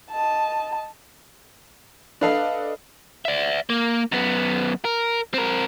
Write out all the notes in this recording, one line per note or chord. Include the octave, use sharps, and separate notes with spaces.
D#5 A5
D4 A4 B4 D#5 F5
D5 E5
A#3
F#2 B3
A#4
C4 A#4